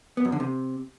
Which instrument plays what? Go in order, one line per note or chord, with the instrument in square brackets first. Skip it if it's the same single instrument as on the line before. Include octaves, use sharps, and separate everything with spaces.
[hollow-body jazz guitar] B3
F#2
D3
C3